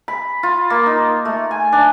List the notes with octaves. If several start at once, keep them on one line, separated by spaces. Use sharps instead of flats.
B5
F4
A#3
D#4
A3
G#5
D4